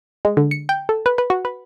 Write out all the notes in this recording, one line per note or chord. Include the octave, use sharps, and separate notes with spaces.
G#3
D3
C#7
G5
A4
B4
B4
F#4
B4